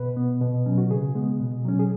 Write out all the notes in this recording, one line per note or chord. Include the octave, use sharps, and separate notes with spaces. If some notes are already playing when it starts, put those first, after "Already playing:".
Already playing: B2 B4
B3
B2
F#3 C#4
F#4
C#3 G#4
G#3 B3
B2
F#3 C#4
G#4